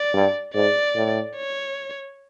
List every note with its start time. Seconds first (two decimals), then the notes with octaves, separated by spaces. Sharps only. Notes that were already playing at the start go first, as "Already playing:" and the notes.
Already playing: D5
0.14 G2
0.54 G#2 D5
0.95 A2
1.36 C#5